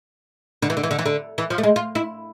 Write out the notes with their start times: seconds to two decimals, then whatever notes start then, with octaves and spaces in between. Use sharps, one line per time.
0.62 D3
0.70 E3
0.77 D3
0.83 E3
0.91 D3
0.99 E3
1.06 D3
1.38 E3
1.50 F3
1.58 A3
1.63 G#3
1.76 F4
1.95 E4